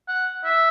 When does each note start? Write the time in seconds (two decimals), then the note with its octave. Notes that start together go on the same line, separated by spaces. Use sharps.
0.08 F#5
0.45 E5